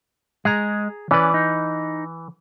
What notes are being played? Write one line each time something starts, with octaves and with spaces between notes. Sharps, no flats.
G#3 G#4 A#5
E3 C#4 B4 D5
D#4